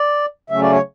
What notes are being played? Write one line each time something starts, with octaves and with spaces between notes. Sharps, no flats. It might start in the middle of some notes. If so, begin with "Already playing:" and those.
Already playing: D5
C#3 F#3 A3 C#4 E5
D5
C#5